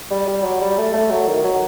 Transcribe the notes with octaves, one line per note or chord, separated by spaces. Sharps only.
G3
G3
F#3
G3
A3
A3
F#3
D#3
F#3